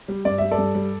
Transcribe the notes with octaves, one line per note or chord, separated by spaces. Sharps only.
G3
G2 D5
G3 E5
A4 D5
G2
G3